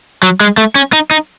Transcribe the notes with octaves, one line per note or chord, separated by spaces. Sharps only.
F#3
G#3
A3
C#4
D#4
D#4